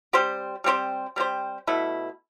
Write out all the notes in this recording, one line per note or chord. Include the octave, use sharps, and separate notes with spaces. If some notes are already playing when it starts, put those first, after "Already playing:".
G3 C4 G4 C5
G3 C4 G4 C5
G3 C4 G4 C5
B2 A3 E4